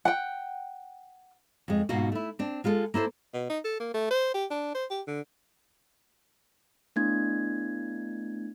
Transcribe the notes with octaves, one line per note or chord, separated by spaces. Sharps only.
F#5 G5
F2 G#3
G#2 B2 A#3 F4 F#4
A3 E4
C4 D4
G#3 F4 G#4 A4
A#3 E4 A4 C5
B2
D#4
A4
A#3
A3
C5
G4
D4
C5
G4
D3
A3 B3 D4 E4 G#6